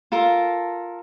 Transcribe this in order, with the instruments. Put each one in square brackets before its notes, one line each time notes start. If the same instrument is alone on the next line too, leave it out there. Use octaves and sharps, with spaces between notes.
[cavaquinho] F4 A4 A#4 A5